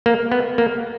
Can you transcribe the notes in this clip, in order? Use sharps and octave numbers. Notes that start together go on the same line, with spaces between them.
A#3
B3
A#3